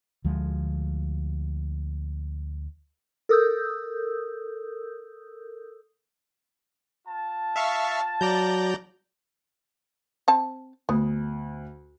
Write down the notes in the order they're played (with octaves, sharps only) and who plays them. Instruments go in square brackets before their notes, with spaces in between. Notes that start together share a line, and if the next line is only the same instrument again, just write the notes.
[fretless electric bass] D2 F3 G#3
[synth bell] A4 A#4 D#6 E6 G6
[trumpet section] F4 A5
[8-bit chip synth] E5 F5 C#6
[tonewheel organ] F#3 [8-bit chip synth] D5 A#5 G6
[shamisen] C4 A5
[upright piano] D2 [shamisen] B3